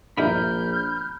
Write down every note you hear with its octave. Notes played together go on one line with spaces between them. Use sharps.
A#1 G2 G#3 E4 A#5 B5 F6 G6